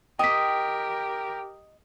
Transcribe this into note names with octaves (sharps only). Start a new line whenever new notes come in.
G4 A#4 D#5 G5 B6